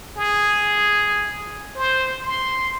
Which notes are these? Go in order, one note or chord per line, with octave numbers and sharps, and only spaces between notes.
G#4
C5
C6